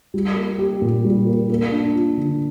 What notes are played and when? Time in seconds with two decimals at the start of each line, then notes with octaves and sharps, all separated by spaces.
0.14 G3
0.36 A#3
0.58 G4
0.82 A#2
1.04 G3
1.27 A#3
1.50 A#3
1.72 D4
1.95 F4
2.17 D3